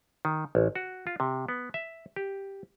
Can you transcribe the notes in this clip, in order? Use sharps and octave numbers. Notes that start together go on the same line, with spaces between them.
D#3
A1
F#4
F4
C3
B3
E5
G4